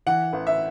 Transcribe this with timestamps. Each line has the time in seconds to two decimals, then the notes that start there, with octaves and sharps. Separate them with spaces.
0.06 E3 F#5
0.33 A1
0.47 E5